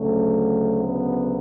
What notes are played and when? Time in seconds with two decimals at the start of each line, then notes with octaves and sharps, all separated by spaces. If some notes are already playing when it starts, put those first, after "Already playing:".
Already playing: D2 C#3 F#3 A3
0.83 B3